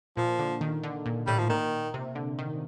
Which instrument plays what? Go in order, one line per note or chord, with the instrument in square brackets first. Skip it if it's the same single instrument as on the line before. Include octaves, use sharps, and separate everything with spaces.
[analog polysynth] A#2 [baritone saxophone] F3
[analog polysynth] D3
D#3
D3
A#2
[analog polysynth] A2 [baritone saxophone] G3
[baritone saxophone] F3
[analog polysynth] A#2 [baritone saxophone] D#3
[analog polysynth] C3
D3
D#3